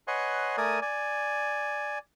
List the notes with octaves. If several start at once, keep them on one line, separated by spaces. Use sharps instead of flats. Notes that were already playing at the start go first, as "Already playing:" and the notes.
B4 C#5 D#5 F#5 G#5 C6
A3 A#4 D5 G#5 D#6
D5 G#5